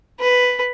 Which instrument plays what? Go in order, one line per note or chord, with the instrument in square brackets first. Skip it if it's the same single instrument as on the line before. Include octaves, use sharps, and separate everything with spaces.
[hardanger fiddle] B4